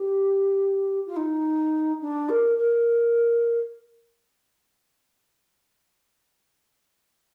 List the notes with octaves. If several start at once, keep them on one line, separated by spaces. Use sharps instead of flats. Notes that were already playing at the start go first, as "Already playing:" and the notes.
Already playing: G4
F4
D#4
D4
A#4
A#4